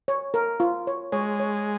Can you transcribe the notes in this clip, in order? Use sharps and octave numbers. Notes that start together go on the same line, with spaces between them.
C#5
A#4
F4
C#5
G#3 C#5
C#5